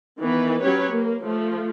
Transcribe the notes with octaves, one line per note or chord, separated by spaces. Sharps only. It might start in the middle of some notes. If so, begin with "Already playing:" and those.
D#3 E3 B3 B4
F#3 C#4 G4 B4 C#5
A#3
F3 A3